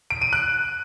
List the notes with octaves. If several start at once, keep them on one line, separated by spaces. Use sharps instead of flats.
D7
D#7
F#6